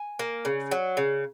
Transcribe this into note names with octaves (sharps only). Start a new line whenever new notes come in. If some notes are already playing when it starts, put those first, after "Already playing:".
Already playing: G#5
A#3
C#3
F#3
C#3